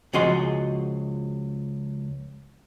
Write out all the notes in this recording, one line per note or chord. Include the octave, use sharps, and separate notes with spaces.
C#2 F3 F#4 G#4 D#5 C6